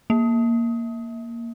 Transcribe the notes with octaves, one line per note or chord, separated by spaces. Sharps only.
A#3